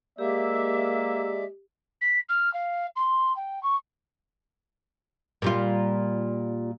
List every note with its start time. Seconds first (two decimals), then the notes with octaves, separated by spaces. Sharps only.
0.18 G#3 A#3 G4 D5 E5
2.01 B6
2.29 F6
2.53 F5
2.96 C6
3.36 G5
3.63 C#6
5.42 A#2 G3 F4